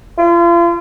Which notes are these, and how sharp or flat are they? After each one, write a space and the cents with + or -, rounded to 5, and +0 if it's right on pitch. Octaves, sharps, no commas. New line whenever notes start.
F4 -35